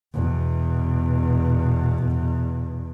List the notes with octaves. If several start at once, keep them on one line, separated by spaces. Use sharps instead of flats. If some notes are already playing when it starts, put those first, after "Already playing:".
E2 B2